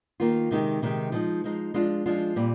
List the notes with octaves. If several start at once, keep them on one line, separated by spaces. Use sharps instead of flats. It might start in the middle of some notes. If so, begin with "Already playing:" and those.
D#3 A#3 F4
C3 D#3 G#3 D#4 G4
C3 D#3 G#3 D#4 G4
F3 G#3 D#4
F3 G#3 D#4
F3 G#3 D4 F4
F3 G#3 D4 F4
A#2 G3 C4